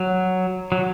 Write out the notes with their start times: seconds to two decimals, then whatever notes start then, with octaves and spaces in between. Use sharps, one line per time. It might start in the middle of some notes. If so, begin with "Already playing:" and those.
Already playing: F#3
0.72 F#3